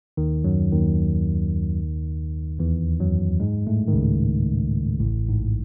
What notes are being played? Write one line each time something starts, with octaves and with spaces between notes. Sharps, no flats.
D#2 D#3
F#2 F#3
D#2 D#3
E2 E3
F#2 F#3
G#2 G#3
A2 A3
D#3
C#2 C#3
A1 A2
G#2